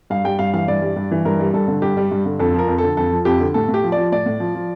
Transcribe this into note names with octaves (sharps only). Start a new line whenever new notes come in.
G2 F5
G3 G5
G2 F5
E3 F5
G2 D5
G3
G2
E3
G2 A#4
G3
G2 A4
D3
G2 G4
G3
G2
D3
F2 A4
F3 A#4
F2
A4
D3
F2 A4
F3
F2 G4
D3
A2 A4
A2
G4
F3
D5
F3
A2 D5
A2
F3
F3